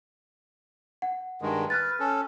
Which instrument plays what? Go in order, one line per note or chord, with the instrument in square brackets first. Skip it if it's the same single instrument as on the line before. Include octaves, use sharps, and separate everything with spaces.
[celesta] F#5
[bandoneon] G2 D#3 G#3
[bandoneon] B4 [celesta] F6 F#6 A6
[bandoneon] C#4 A4